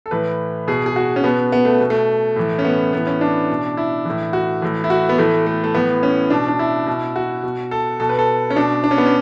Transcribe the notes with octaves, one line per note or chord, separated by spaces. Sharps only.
A4
A2 E3 B4
B2 G#4
G#4
F#4
C#4
B2 B3
B3
A3
B2
A3
A2 E3
C#4
B3
A2 E3 B3
C#4
D4
B2
E4
A2 E3
F#4
A2 E3
E4
F#4
B3
A2 E3 A3
A3
A3
A2 E3 B3
C#4
B2 D4
D4
E4
B2
F#4
B2
A4
B2 A4
B4
A4
C#4
B2 D4
D4
C#4
B3
C#4